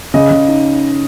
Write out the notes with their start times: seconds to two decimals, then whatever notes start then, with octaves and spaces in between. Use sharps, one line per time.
0.14 C#3 D#5
0.31 C#3
0.48 D#4